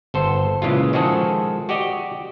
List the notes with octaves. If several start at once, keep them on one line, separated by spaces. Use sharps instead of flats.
G1 A4 C5
A#2 C#3 E3 G#3 F4
D#3 F3 G#3 F#4 G#4 A4
F#4 G4 D5 D#5